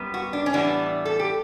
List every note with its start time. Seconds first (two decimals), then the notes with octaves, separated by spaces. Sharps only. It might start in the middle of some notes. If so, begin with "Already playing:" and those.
Already playing: F#2 G3 B3
0.14 F#4
0.33 D4
0.46 C#4
0.53 A2 E3 G3 B3 D4
1.05 A4
1.19 G4